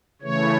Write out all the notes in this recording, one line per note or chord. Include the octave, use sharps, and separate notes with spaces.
C#3 E3 A3 C#5